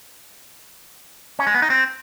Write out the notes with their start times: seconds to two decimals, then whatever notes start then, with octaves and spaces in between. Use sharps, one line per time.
1.39 C#4
1.47 G#3
1.54 B3
1.62 D#4
1.70 C4